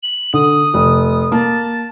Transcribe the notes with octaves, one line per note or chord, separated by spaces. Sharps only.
F#7
D3 D#6
F1
A#3 A5